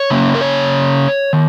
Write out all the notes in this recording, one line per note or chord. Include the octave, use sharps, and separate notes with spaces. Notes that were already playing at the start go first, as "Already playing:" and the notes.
Already playing: C#5
C#3 A#3 C#4
A#4
C#5
D#3